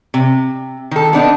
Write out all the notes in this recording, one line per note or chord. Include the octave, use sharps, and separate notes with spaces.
C3
D#3 A4
B3 D4 D#4